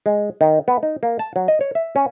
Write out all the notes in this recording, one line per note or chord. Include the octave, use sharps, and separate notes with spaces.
G#3
D#3
B3
D#4
A#3
A5
F#3
D#5
C#5
E5
C#4